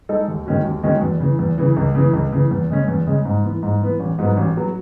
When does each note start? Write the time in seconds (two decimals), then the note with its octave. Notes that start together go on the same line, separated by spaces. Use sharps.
0.09 G#3 D#4 A4
0.28 D#2
0.46 D#3 G#3 C#4 F#4
0.65 D#2
0.83 D#3 G#3 C#4 F#4
1.02 E2
1.20 C#3 E3
1.39 E2
1.58 C#3 E3
1.77 C#2
1.95 C#3 E3
2.13 C#2
2.32 C#3 E3
2.51 E2
2.70 C#3 G#3 C#4
2.88 E2
3.07 C#3 G#3 C#4
3.25 G#2
3.44 E3 B3
3.63 G#2
3.82 E3 B3
4.00 A1
4.19 G#2 F#3 B3
4.37 A1
4.56 F#3 B3